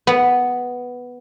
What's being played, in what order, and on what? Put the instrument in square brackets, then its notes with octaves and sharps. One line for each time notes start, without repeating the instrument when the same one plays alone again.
[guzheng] B3